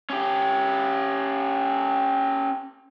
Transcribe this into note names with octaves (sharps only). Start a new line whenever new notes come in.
C#4 G4